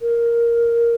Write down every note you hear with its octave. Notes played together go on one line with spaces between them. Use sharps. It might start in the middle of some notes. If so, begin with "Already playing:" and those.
A#4